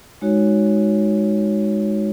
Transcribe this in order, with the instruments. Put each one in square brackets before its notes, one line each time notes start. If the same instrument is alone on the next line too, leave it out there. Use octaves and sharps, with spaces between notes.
[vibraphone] G#3 D#4 F#4 C#5